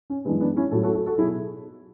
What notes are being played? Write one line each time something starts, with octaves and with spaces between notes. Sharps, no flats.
C#4
F#2 E3 G#3 B3 D4
B3 D4
C#4 E4
A2 F#3 F#4 A4
F#4 A4
F#4 A4
F#4 A4
B2 F#3 E4 G#4